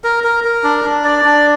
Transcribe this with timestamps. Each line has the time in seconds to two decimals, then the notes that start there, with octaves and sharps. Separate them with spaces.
0.04 A#4
0.24 A#4
0.44 A#4
0.64 D4
0.85 D4
1.05 D5
1.24 D4